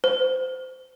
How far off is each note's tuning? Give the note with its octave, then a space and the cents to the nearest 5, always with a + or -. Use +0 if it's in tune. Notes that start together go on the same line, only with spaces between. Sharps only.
C5 -20